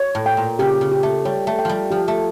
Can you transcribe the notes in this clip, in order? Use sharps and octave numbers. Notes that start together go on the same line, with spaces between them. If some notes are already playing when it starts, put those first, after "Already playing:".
Already playing: C#5
A2
G5
A#2
C#3 G4
C#3
G4
A3
G3 C#5
A3
G5
F3 G3
F3 G4
A3